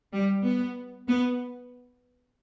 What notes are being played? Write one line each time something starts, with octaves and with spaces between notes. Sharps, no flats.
G3
B3
B3